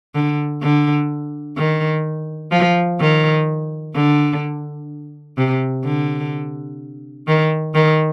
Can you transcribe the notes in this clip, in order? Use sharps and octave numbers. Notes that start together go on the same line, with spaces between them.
D3
D3
D#3
F3
D#3
D3
C3
D3
D#3
D#3